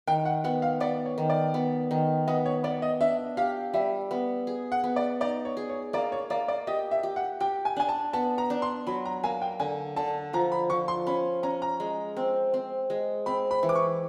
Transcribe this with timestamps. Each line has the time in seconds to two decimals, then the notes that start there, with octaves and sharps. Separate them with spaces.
0.07 D#3 G5
0.25 F#5
0.44 B3 F#5
0.62 F5
0.80 B3 D5
1.06 C#5
1.18 D#3
1.30 D5
1.54 B3
1.91 D#3
2.27 B3 D#5
2.46 C#5
2.64 B3 D5
2.82 D#5
3.01 D4 E5
3.37 G4 F5
3.74 G3 E5
4.11 B3
4.47 G#4
4.72 F#5
4.84 B3
4.96 D5
5.21 D#4 D5
5.45 C#5
5.57 G#4
5.69 C#5
5.93 A#3 D5
6.12 C#5
6.30 A#3 D5
6.48 D5
6.67 G4 D#5
6.91 E5
7.03 G4
7.16 F#5
7.40 G4 G5
7.65 G#5
7.76 D4 G#5
7.89 A5
8.13 B3 A5
8.38 A#5
8.50 D4
8.62 C6
8.87 F#3 B5
9.05 A#5
9.24 A#3 G#5
9.42 G5
9.60 D3 G#5
9.96 D3 A5
10.33 F3 A#5
10.52 B5
10.70 F3 C#6
10.88 C6
11.07 C#4 B5
11.43 C#4 A#5
11.62 A#5
11.80 G#3
12.17 C4
12.54 C4
12.90 G#3
13.26 C4 B5
13.51 B5
13.63 E3
13.69 D6
13.75 C#6